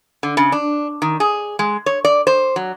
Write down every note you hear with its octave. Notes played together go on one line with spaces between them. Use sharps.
D3
C#3
D4
D#3
G#4
G#3
C#5
D5
C5
F#3